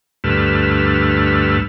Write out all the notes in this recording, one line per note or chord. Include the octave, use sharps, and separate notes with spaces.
D2 G2 A3 B4 E6 F6